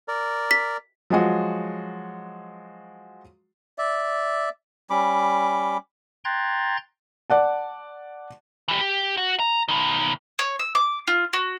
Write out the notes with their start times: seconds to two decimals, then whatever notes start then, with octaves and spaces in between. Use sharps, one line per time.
0.08 A#4 D5
0.51 B6
1.10 F3 F#3 G#3 F#4
3.78 D5 E5
4.90 G3 C#4 B5 D6
6.25 G5 A#5 C6 F#6 G#6 A6
7.30 D5 F#5 A5
8.68 E3 G4
8.81 G4
9.17 F#4
9.39 A#5
9.68 B2 D#3
10.39 C#5
10.59 E6
10.75 D6
11.07 F4
11.33 F#4